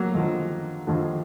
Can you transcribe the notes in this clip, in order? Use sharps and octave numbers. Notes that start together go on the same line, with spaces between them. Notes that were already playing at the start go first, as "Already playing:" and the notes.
Already playing: F#3 A#3
D#2 D3 F3
D#2 D3 F3